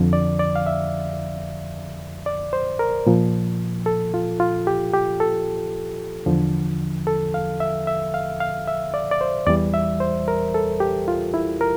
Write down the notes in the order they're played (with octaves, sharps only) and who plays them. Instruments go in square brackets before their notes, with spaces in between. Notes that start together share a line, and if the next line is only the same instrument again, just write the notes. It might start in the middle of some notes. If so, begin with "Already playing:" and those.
Already playing: [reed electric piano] F2 D3 F3
D5
D5
F5
E5
D5
C5
A#4
A#2 F3
A4
F4
F4
G4
G4
A4
E2 D3 F3
A4
F5
E5
E5
F5
F5
E5
D5
D5
C5
E2 E3 G3 D5
E5
C5
A#4
A4
G4
F4
E4
A#4